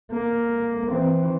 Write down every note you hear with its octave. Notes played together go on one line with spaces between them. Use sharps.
A#3
E3 C4